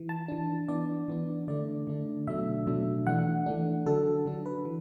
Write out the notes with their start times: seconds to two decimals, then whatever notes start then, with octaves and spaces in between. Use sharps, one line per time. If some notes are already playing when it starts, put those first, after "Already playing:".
Already playing: E3
0.09 A5
0.28 E3 D4
0.68 E3 B3 D4 D5
1.08 E3 B3 D4
1.48 D3 A3 D4 D5
1.87 D3 A3 D4
2.27 B2 F#3 A3 D4 E5
2.67 B2 F#3 A3 D4
3.07 E3 A3 D4 F#5
3.46 E3 A3 D4
3.86 D3 F#3 D4 A4
4.26 D3 F#3 D4
4.46 B4
4.65 E3